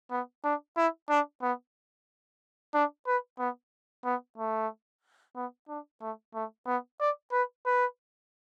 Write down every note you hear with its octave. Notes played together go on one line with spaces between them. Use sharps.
B3
D4
E4
D4
B3
D4
B4
B3
B3
A3
B3
D4
A3
A3
B3
D5
B4
B4